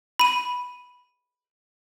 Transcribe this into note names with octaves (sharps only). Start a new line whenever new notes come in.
B5 D#7